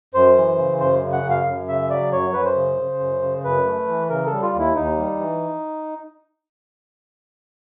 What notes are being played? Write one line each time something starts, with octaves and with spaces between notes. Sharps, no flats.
F#2 C5
E3
C#3
F#2 C5
C#3
F#5
F#2
F5
F#2
C#3 E5
F#3 D5
F#2 C#5
F#2 B4
C5
C#3
C#3
F#2
C#3
F#2 B4
A3
E3
C#3 A#4
G3 A4
F4
D#2
E4
D#2 D#4
G3
E3